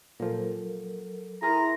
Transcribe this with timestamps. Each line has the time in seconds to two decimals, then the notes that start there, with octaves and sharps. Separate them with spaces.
0.20 A#2 F3 F#3 A4 A#4
1.43 E4 G#4 A#4 A#5 C6